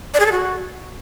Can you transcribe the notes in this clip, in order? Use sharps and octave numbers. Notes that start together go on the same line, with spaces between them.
D5
G#4
A4
F#4